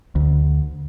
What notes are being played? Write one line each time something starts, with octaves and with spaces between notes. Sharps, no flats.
D2